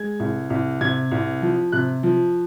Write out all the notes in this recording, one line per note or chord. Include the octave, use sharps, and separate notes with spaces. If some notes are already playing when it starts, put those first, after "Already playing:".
Already playing: G#3 G#6
C2
C2
C3 G#6
C2
F3
C3 F#6
F3